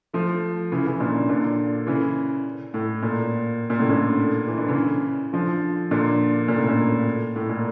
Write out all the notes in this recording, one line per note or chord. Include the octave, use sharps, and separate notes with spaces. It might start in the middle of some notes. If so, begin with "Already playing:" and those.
F3 A3
C#3 E3
C#3 E3
A#2 D3
A#2 D3
C#3 E3
A2
A#2
A#2
A2 C#3
A#2 D3
E3
D3
C#3 E3
D3 F3
A#2 D3
A#2 D3
A2 C#3
A#2
A2
A#2